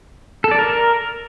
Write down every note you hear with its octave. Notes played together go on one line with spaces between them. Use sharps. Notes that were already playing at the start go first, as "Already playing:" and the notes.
A4
D5
A#4